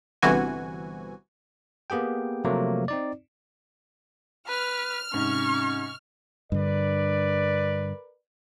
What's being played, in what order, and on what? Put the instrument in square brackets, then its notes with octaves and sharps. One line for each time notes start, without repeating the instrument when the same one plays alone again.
[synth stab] G1 C3 E3 F#4 G#5
[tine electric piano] A#3 B3 G4 G#4 G5
C3 F3 F#3 A3 A#3
C4 D#4 D5
[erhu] B4 [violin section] F6
[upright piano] G#2 C3 [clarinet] C#4 [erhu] C#6
[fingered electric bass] G2 D3 [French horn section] A#4 B4 D5